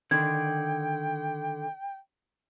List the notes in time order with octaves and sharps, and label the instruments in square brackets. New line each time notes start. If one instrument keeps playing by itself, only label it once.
[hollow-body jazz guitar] D3 D#3 [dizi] G5 [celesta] G#6